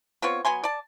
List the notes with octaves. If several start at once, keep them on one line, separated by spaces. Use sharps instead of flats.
B3 C4 F4 C#5
F#3 B3 G#5 C6
D5 A5